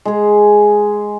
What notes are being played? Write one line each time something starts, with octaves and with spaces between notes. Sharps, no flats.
G#3 G#4